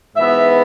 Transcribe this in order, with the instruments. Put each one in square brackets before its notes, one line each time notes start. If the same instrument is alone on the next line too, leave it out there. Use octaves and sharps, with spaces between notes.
[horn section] G#2 E3 B3 E5